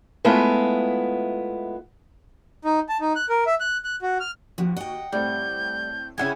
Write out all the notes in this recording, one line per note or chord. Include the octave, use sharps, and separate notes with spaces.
G#3 A3 B3 E4 F4
D#4
A5
D#4
F#6
A#4
E5
F#6
F#6
F#4
F6
D#2 F3 F#4
D#5 F#5 G5
A2 G3 A3 C4 G6
C#3 C#4 E4 G4 G#4 F#5 G#5 G#6